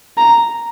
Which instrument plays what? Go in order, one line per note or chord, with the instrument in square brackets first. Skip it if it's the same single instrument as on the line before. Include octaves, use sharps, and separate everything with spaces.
[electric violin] A#5